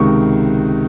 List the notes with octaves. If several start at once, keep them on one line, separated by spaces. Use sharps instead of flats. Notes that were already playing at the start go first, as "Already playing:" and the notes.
Already playing: C#2 C3 D#3 C#6